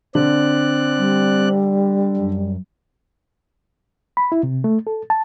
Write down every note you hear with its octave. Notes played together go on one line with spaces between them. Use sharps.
D3 C4 D5 F#6
G3
F#2
B5
E4
C3
A3
A4
A5